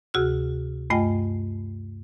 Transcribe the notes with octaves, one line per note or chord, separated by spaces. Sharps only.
D2 C3 F#4 G#4 F6
G2 A3 F4 D#5 G5 G#5